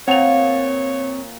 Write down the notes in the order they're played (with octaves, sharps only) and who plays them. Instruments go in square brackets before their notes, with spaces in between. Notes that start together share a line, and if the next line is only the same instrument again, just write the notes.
[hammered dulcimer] A#2 [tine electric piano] C4 [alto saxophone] C#5 [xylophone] F#5 F7